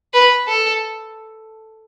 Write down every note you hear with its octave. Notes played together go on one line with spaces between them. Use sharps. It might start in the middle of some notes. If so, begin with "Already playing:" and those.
B4
A4